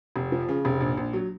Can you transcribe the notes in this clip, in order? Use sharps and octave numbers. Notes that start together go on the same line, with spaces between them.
F1
F3
C#3
F1
A#1
A#1
F#3